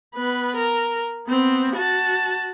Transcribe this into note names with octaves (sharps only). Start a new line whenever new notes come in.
B3 B4
A#4
B3 C4
F#4 A5